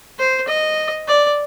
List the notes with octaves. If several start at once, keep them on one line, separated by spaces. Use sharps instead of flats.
C5
D#5
D5